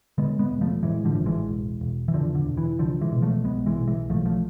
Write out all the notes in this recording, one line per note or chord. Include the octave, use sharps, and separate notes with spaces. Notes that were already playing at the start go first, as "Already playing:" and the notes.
D3 G#3 B3
G#3 B3
E1
F3 A3
A2 E3 G#3
D3 F3
A1
E3 G#3
E1
E1
E3
E2 D3 F3
D3
E1
E3
C2 D3 F3
E3 G#3
B2
F3 A3
B1 G#3 B3
E3 G#3
B1
E3 G#3
B1 F3 A3
F3 A3